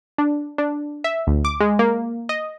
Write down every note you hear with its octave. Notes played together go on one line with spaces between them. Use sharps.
D4
D4
E5
D2
D6
G#3
A#3
D#5